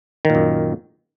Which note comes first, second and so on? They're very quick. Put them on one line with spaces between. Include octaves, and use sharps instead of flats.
D#3 A#2 F#2